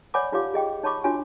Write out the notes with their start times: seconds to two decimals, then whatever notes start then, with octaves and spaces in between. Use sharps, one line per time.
0.14 C#5 D5 F#5 G#5 B5 D6
0.32 D#4 F4 G4 C#5 F5 D6
0.54 G#4 D#5 G5
0.83 D#4 C#5 A5 B5 C#6 D6
1.04 D4 F4 F#4 C#5 G#5